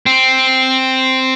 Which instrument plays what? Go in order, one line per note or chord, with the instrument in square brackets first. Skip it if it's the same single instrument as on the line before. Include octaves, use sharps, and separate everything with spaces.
[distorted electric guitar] C4